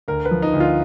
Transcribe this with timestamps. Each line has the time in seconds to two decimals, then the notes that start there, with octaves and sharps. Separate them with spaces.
0.08 D2 A#4
0.25 B4
0.31 F3
0.42 D#4
0.53 D2
0.60 F4